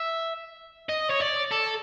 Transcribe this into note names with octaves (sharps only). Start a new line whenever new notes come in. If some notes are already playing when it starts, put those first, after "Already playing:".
Already playing: E5
D#5
C#5
D5
A4